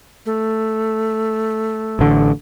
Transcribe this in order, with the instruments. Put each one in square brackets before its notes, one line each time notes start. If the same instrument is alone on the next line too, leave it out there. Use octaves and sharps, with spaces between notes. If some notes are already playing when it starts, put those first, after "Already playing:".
[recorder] A3
[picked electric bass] A1 D3